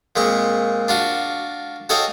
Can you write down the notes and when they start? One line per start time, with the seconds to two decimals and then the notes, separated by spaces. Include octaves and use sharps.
0.16 A#2 G#3 C4 C#6
0.88 D4 F4 F#4
1.89 F#4 A4 C#5 D#5 F5 G5